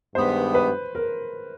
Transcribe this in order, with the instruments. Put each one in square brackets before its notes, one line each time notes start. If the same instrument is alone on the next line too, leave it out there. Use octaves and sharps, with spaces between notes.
[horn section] G2 D#3 G#3 B3 [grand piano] C5
[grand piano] B4
A#4